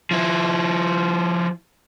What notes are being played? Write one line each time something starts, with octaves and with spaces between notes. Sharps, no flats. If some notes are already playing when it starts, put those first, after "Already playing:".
F3 E4